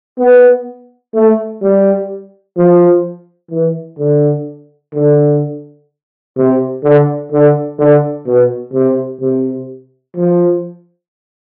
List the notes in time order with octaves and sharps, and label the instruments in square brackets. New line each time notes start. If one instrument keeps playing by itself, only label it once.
[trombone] B3
A3
G3
F3
E3
D3
D3
C3
D3
D3
D3
B2
C3
C3
F3